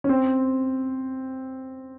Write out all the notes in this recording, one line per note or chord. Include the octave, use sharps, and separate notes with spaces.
C#4
C4